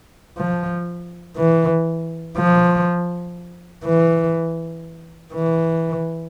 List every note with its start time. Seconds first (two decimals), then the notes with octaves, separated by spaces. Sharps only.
0.38 F3
1.37 E3
2.36 F3
3.84 E3
5.33 E3